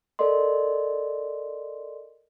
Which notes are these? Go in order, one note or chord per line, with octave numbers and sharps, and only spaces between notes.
A4 A#4 D5 D#5 C6